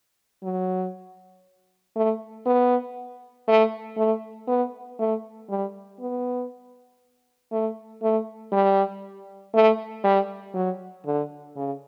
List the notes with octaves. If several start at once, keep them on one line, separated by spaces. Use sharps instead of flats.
F#3
A3
B3
A3
A3
B3
A3
G3
B3
A3
A3
G3
A3
G3
F#3
D3
C#3